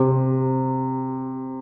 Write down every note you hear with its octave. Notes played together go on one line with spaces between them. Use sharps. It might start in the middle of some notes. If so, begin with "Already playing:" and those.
Already playing: C3